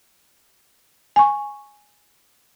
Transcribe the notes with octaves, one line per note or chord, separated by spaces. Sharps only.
G#5 C#6